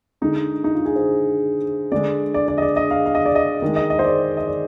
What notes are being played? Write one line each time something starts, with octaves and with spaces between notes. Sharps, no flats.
D3 G#3 D#4
D#4
F4
G#4
C5
D3 G#3 D5
D5
D5
D#5
D5
D#5
F5
F5
D#5
D5
D#5
D#3 G#3
D#5
D#5
C5
D5
D#5
D5